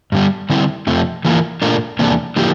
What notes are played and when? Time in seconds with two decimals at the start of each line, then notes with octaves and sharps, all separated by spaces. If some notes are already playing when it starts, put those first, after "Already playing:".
0.12 G2 D3 G3
0.50 D3 G3 C4 E4
0.87 F2 C3 F3 A3
1.25 E3 A#3 F4 A#4
1.62 A#2 A3 D4 F4 A#4
1.99 E2 C3 E3 A#3 D4
2.36 D3 F3 A#3 E4 G4